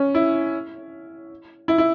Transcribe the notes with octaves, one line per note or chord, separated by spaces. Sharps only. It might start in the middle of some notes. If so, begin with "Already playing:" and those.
Already playing: C#4
E4
E4
E4